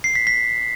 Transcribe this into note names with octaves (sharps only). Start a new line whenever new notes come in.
C7
B6
B6